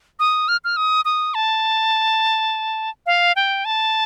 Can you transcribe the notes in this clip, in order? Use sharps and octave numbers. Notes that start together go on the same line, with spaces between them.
D#6
F6
F6
D#6
D#6
A5
F5
G5
A5